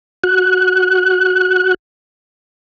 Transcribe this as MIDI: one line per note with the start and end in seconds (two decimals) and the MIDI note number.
0.24 1.74 66
0.24 1.74 90